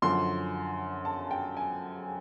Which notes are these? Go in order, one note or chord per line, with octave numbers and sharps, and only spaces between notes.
F#2 D3 F3 C6
A5
G5
G#5